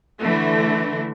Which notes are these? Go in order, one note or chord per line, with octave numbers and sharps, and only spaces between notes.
D3 E3 A3